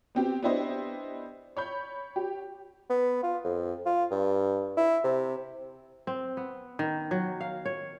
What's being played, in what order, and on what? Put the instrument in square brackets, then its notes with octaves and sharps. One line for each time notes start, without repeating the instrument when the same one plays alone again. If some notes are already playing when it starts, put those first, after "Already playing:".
[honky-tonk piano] B3 C4 G4
B3 D4 E4 G4 C5 D#5
C#5 B5 G6
G4
[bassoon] B3
F4
F2
F4
G2
E4
C3
[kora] C4
B3
D#3
F#3
F5
C#5